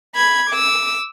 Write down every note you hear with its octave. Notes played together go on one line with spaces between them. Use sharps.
B5 G#6
D6 E6